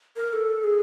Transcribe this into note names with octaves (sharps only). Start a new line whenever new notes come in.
A#4
A#4
A4
G#4